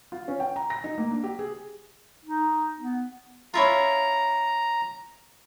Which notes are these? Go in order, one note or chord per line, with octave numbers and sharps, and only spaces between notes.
F4
C#4
G5
A#5
A#6
D#4
A#3
D4
G4
G#4
D#4
B3
C#4 E4 F4 A#5